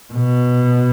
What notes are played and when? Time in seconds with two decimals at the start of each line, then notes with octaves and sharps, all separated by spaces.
0.13 B2